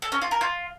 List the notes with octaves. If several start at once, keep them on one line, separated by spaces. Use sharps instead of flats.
A4
C#4
F4
A#4
F4